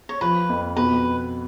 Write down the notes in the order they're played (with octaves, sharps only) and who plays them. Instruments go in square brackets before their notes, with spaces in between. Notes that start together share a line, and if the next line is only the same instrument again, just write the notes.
[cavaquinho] C#5
[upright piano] F3 [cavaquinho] B4
[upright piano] F2
[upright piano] B2 [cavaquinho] B4